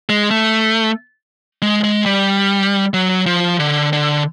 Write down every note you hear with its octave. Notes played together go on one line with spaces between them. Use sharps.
G#3
A3
G#3
G#3
G3
F#3
F3
D3
D3